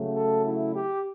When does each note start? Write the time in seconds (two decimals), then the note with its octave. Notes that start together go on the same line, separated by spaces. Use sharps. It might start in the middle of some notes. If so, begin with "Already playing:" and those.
Already playing: C#3 F#3 A3
0.13 A4
0.43 E4
0.72 G4